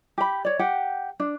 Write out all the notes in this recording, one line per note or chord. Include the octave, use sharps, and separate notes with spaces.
G4 B5
C#5 D5
G4 F#5 G5
D4